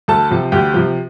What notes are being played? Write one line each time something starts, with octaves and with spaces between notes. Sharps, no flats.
D2 A4 A5
C3 F3
D2 G4 G5
C3 F3